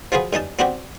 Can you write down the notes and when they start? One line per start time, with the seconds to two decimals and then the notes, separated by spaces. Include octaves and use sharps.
0.12 F3 F#3 F4 G#4 B4
0.33 G2 C#4 D#4 A5
0.59 B3 C4 D4 F#4 G4